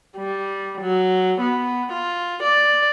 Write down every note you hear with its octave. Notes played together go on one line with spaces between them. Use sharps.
G3
F#3
B3
F4
D5